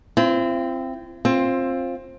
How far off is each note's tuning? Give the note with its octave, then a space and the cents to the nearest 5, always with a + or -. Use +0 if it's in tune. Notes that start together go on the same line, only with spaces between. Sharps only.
C4 +0 F4 -45
C4 +20 F4 +5